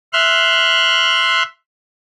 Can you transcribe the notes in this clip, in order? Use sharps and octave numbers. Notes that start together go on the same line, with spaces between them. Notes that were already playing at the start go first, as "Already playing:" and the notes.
E5 C6 F6 F#6